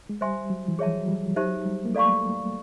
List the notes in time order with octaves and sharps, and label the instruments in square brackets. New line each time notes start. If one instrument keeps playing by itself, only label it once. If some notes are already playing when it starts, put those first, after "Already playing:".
[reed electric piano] G#3
[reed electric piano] G3 [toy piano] C5 E5 G#5 C6
[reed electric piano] F#3
E3
[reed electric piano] F3 [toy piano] G#4 C#5 E5 A5
[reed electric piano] F#3
G3
[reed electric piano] F#3 [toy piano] D#4 G4 C5 E5 A5
[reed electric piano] G3
A#3
[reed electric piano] A3 [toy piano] A4 D5 F5 A#5 C#6